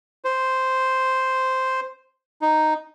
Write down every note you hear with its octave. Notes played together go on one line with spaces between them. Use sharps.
C5
D#4